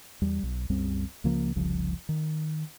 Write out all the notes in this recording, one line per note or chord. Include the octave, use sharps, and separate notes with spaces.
E2 G3
B1
C2 F#2 G3 C4
C#2 C#3 F3 A#3
F1 C2 C#3 F3
D#3